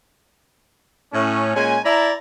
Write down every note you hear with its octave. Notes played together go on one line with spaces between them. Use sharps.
A2 C#4
A#2 G#3 C#4 G#5
E4 D5 E5 A5 A#5